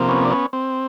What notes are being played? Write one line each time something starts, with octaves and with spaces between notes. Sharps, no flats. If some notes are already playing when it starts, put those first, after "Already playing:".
Already playing: C3 F3 A#3
B3 C#4
D4
B3 C#4
C4